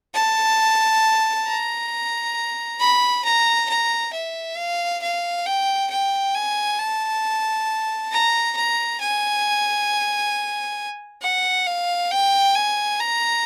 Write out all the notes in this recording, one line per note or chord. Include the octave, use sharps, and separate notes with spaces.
A5
A#5
B5
A#5
A#5
E5
F5
F5
G5
G5
G#5
A5
A#5
A#5
G#5
F#5
F5
G5
G#5
A#5